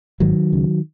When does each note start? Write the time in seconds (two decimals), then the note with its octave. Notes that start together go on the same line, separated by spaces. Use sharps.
0.20 G#1 G#2 D#3 F#3
0.53 C#2 C#3